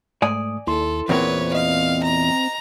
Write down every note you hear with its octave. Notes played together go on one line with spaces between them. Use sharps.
G#2 A3 D5 G#5 D#6
D#2 E4 A4 C6
E2 A#2 C4 A#4 B4 C#5
D#5 F5
A#5